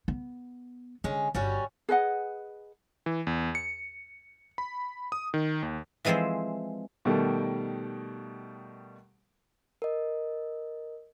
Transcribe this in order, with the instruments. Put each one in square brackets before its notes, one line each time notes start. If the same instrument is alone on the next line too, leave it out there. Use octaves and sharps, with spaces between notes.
[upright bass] B3
[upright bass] D3 [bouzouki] G#3 C#4
[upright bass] G1 [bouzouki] G3 C#4 F#4
[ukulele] G#4 B4 D#5 F#5
[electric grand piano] E3
E2
C#7
B5
D#6
D#3
D#2
[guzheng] E3 F3 G#3 C4 A4 C5
[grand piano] B2 D#3 G3 A3
[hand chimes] A#4 D#5